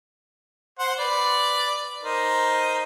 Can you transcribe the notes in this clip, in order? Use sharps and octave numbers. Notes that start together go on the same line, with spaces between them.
C5 F#5 C6
B4 D5
D#4 A#4 C5